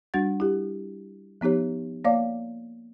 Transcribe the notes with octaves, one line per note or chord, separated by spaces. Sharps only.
G3 D4 F#4 F#5 A6
E4 G4
F3 B3 D#4 G4 C#5
A#3 C#5 D5 F5 D6